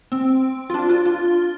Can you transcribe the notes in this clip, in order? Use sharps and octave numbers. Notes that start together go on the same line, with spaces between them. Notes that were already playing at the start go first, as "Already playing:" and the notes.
C4
F4
D4
F4
F4